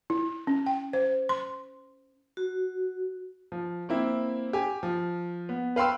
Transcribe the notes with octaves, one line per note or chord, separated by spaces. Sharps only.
E4
C#4
G5
C5
C6
F#4
F3
A#3 C4 E4
G4 G#5
F3
B3
B4 F5 G5 C6 E6